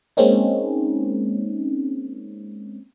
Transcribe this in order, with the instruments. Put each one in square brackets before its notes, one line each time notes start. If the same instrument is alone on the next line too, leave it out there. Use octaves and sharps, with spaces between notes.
[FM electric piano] G#3 A#3 C4 C#4 D#4